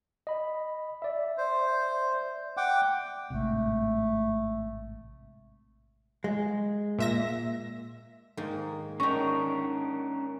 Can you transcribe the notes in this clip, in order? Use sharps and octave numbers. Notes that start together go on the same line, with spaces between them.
D#5 B5
D5 E5
C5
F#5 G5 D6
A1 G#2 C3 A3
G#3
A#2 E5 A#6
G#2 D#3 A#3
D#3 C#4 D4 A#4 A#5 C#6